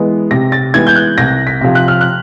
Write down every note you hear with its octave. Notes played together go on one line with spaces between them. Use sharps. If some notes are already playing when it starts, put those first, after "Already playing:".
Already playing: E3 G#3 B3
C3 A#6
A6
E3 G#3 B3 G#6
G6
F#6
C2 A#6
B6
C3 F3
F#6
F6
F#6